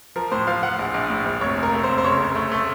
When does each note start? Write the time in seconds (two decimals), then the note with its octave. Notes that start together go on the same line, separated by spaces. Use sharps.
0.16 F3 A#4
0.32 A2 C5
0.47 F3 F5
0.63 F3 F#5
0.79 A#1
0.94 A#1
1.10 A2
1.26 A#1
1.41 F1 C#5
1.57 F1
1.63 A#4
1.73 A3
1.83 C5
1.89 F1
1.98 C5
2.04 C#3 C#5
2.20 F1
2.35 A3
2.52 A3